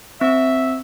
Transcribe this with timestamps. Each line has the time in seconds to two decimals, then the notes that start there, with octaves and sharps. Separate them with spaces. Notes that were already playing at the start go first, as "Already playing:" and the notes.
0.21 C4 E5